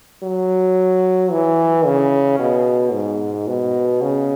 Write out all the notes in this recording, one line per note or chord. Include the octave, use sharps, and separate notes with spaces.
F#3
E3
C#3
B2
G#2
B2
C#3